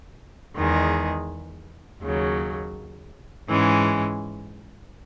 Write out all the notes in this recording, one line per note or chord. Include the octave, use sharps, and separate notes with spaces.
E2 D#3 G#3
D#2 C#3 F#3
G#2 E3 G#3 C#4